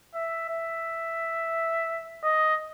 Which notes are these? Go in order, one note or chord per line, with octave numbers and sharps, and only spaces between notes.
E5
E5
D#5